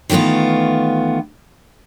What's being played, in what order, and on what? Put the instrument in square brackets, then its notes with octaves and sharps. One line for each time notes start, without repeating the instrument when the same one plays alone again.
[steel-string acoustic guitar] D#3 E3 A3 B3 F4